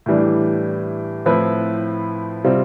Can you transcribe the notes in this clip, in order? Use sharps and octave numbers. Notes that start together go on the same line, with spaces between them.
A2 E3 G3 D4
A2 F3 C4 E4 B4
C3 G3 C4 F4